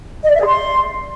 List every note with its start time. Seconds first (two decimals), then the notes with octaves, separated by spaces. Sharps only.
0.23 D#5
0.29 D5
0.35 E5
0.40 G#4
0.46 C6